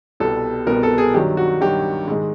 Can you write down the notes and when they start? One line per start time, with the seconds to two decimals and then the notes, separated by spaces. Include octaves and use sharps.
0.20 C2 B2 G3 B3 A4
0.67 C2 B2 G3 B3 A#4
0.83 A4
0.98 G#4
1.14 G2 D#3 F#3 G4
1.37 F#4
1.61 G2 D#3 F#3 G4
2.08 G#2 D#3 G#3